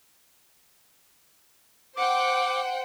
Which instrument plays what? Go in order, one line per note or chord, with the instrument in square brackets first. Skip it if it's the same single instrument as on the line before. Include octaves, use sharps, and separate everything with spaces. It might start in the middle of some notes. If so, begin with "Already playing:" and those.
[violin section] C5 F#5 G5 [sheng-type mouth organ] D6